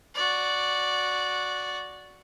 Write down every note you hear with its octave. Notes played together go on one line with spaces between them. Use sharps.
F#4 D5